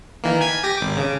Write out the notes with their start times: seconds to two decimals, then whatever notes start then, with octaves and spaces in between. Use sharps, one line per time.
0.24 D#3 E3 A#3
0.41 G#5 G#6 B6
0.63 G4 A#6
0.77 G#1 D6
0.97 C#3